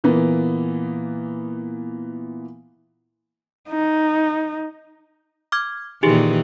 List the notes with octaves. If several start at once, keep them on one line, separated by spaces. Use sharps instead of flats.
A#2 E3 A#3 B3
D#4
D6 F6 G#6
A#2 D#3 E3 D#4 G4 G#4